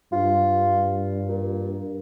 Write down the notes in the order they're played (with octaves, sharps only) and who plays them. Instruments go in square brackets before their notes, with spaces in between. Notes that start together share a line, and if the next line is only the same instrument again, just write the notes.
[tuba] G2 [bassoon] F4
[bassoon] A#2